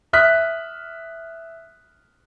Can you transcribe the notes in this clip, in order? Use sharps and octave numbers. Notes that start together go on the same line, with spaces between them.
E5 D#6 F6 F#6 B6